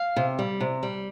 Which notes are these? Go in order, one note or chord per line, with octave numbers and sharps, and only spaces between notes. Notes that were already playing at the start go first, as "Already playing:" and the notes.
Already playing: F5
C3
G3
C3
G3